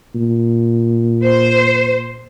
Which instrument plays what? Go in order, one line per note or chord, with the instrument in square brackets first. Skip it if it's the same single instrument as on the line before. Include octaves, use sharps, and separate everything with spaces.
[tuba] A#2
[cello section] C5